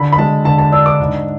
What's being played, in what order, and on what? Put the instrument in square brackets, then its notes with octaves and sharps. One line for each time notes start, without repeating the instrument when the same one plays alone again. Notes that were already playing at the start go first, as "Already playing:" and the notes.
Already playing: [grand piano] D3 B5
B5
G#3 A5
D3 A5
A5
D4 E6
D6
G#2